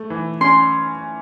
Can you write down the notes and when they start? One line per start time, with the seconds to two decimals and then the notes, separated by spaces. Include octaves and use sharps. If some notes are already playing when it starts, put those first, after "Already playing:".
Already playing: A3
0.10 E3
0.41 C#4 C6